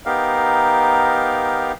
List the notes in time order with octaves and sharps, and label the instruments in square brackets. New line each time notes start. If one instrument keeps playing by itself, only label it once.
[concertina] B3 D#4 G4 A#4 F5